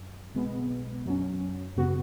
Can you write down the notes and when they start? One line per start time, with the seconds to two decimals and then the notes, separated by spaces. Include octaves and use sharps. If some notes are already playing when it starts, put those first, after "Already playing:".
Already playing: F#2
0.34 B1 B2 G#3 B3
1.06 F#2 F#3 C#4
1.77 G#1 F#2 C#3 B3 F#4